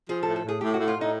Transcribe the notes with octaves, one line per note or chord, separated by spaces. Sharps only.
F3 G#4
A4
A2
A4
A2
G#4
A2 G4
F#4
A2
F4
A2
D#4